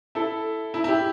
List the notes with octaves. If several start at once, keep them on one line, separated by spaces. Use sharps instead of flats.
E4 A4
E4
E4
G4